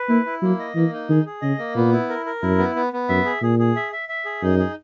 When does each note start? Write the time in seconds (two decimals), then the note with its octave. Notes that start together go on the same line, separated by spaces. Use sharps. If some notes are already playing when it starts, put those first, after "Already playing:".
Already playing: B4
0.09 A#3 E4
0.26 E4
0.42 F#3 A#3
0.59 D#5
0.75 E3 A#3
0.92 D#4
1.09 D#3 G#4
1.26 G#4
1.42 C#3 D#5
1.59 A#3
1.75 A#2 B3
1.92 E4
2.09 A#4
2.26 A#4
2.42 F#2 E4
2.58 B3
2.75 B3
2.93 B3
3.09 F#2 E5
3.25 G#4
3.42 A#2 G#4
3.59 G#4
3.76 E5
3.92 E5
4.09 E5
4.25 G#4
4.42 F#2 D#4
4.59 G#4